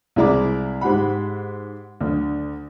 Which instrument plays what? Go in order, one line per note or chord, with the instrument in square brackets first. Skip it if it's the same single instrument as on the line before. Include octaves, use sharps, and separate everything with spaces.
[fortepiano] C2 G#3 E4 D5 A#5 D6
G#2 G4 F#5 B5
D2 D3